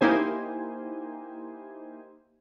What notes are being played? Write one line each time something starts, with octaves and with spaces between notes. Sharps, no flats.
A#3 D#4 E4 G4 C5 G#5